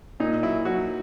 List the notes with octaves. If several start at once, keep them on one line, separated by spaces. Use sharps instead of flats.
A#2 D#4
F#3 E4
F#3 F#4